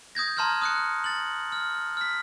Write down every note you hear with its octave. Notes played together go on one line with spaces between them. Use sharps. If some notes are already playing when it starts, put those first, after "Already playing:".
D#6 G6 G#6 A#6
A5 A#5 C6 F6 G6 G#6
D#6 F#6 C#7
A6 F#7
F6
F6 B6